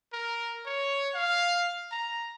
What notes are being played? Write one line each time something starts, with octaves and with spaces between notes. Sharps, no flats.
A#4
C#5
F5
A#5